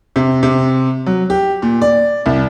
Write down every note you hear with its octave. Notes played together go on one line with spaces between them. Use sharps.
C3
C3
F#3
G4
A#2
D5
C2